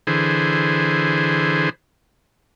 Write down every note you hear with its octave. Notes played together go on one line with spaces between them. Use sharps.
D3 E3 G#4 C5